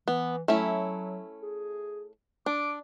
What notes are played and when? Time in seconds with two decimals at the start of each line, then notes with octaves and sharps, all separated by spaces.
0.08 E3 B3
0.48 F#3 A3 C#4 E4
1.42 G#4
2.46 D4 D6